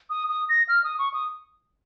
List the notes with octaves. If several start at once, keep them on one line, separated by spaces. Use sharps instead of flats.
D#6
D#6
A#6
F6
D#6
C#6
D#6